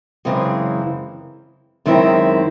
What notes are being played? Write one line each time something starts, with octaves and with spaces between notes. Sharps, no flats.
F#2 C#3 E3 G#3 C4
F#2 D#3 G#3 C4 E4